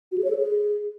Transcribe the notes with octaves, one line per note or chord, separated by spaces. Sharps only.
F#4
G#4
C#5
A4
G#4